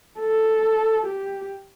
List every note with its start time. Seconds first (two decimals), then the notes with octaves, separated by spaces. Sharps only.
0.20 A4
1.06 G4